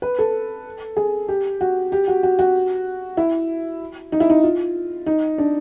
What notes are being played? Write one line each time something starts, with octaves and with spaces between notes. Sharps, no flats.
B4
A4
G#4
G4
F#4
G4
F#4
F#4
F#4
E4
D#4
E4
D#4
F4
D#4
D4